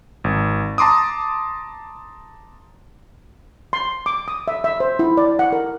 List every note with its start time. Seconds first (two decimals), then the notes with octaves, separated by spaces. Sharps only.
0.24 G#1
0.78 A5 A#5 C6 D6 D#6
3.73 C6
4.06 D6
4.28 D#6
4.48 E5
4.64 E5
4.80 C5
4.99 E4
5.17 D5
5.39 F#5
5.53 A#4